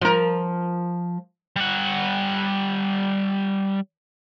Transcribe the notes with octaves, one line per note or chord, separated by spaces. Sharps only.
F3 A#4
G3 F#5